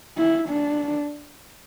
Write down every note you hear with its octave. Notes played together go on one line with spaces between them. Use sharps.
E4
D4